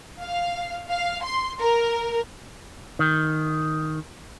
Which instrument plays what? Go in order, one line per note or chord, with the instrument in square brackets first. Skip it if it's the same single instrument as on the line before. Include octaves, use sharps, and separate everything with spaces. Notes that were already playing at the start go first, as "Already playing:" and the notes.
[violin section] F5
F5
C6
A#4
[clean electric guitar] D#3